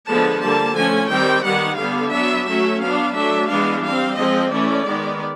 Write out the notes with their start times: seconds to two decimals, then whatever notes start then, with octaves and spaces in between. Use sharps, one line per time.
0.09 D3 F3 G#3 B3 D4 A5
0.43 D3 G3 A#3 A5
0.77 F3 A3 C#4 G#5
1.11 D#3 G3 C4 G5
1.45 D#3 G3 B3 F#5
1.80 D3 G3 B3 F5
2.14 F#3 B3 D4 E5
2.47 F#3 A3 C#4 E5
2.82 F#3 B3 D4 F5
3.16 F#3 A3 D4 E5
3.50 E3 G#3 B3 D4 F5
3.84 G3 C4 F5
4.18 F3 G#3 C4 D#5
4.52 E3 A3 C#4 D5
4.86 D#3 G#3 B3